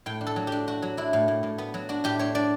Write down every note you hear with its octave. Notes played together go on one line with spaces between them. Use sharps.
A2 G5
D4
A4
F#3
D4 G4
D4 F#4
F#3
D4 E4
A2
A2
A2
B3
F#3
D4 F#4
A2 G4
D4 C#5
D4 D5